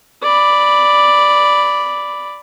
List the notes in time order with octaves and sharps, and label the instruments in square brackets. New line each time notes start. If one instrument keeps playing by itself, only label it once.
[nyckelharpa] D5 B5